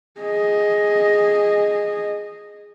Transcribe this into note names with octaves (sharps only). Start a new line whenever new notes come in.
G#4 D#5